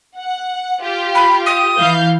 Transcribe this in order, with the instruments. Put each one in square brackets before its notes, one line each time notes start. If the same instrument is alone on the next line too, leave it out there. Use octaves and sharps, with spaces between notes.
[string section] F#5
F4 G4
[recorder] B5
D#6
[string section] E3 F5 G6